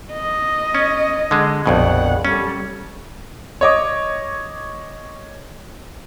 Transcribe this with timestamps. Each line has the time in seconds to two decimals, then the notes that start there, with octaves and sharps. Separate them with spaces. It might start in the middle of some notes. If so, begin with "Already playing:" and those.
0.13 D#5
0.75 C#4
1.31 D3 G#3
1.66 A#1 F2 B2 F#5
2.25 G3 C#4 A4
3.61 C#5 D#5 D6